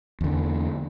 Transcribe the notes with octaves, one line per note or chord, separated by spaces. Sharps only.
E2 D3